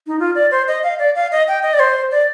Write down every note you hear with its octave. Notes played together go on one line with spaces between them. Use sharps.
D#4
F4
D5
C5
D#5
F5
D5
F5
D#5
G5
D#5
D5
C5
D5